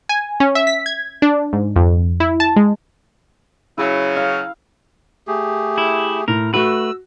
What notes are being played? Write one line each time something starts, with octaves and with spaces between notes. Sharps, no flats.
G#5
C#4
E5
B6
G#6
D4
G#2
F2
E4
A5
G#3
C#3 F#3 E4
F5
A3 G4 G#4
E4
A2 A#4
A3 F#4 B4 E6